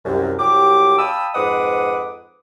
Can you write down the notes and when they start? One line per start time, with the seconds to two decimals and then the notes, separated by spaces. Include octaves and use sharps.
0.05 C2 F#2
0.39 C2 F#3 G4 D6
0.99 F5 G5 A5 B5 D#6 E6
1.35 F2 G#2 B4 F#5 D6 D#6